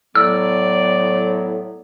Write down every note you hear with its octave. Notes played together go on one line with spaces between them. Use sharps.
A2 F#3 B3 D5 E6